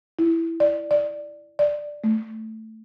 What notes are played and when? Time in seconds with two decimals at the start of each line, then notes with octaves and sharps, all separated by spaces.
0.19 E4
0.60 D5
0.91 D5
1.59 D5
2.04 A3